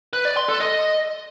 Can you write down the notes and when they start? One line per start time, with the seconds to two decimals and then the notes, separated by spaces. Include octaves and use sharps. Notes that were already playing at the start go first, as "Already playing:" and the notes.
0.13 B4
0.25 D5
0.37 C6
0.48 A4
0.60 D#5